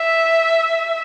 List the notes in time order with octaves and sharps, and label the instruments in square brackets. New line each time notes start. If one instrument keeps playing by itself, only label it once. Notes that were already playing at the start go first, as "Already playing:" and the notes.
Already playing: [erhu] E5